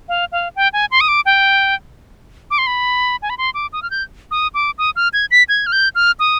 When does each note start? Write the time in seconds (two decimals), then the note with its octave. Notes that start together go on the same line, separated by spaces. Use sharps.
0.09 F5
0.32 F5
0.56 G5
0.73 G#5
0.91 C6
1.01 D#6
1.08 D6
1.26 G5
2.51 D6
2.58 C6
2.67 B5
3.22 G#5
3.30 B5
3.38 C6
3.54 D6
3.73 D#6
3.82 F6
3.91 G6
4.31 D#6
4.54 D6
4.78 D#6
4.96 F6
5.13 G#6
5.31 B6
5.49 G#6
5.66 F6
5.72 G6
5.95 F6
6.20 D#6